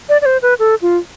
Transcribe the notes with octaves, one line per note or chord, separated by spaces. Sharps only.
D5
D5
C5
B4
A4
F4